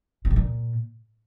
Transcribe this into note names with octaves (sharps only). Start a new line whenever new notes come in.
D#3
A2
A#2